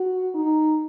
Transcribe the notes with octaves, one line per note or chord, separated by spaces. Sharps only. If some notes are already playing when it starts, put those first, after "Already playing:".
Already playing: F#4
D#4